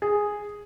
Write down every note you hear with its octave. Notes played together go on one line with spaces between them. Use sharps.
G#4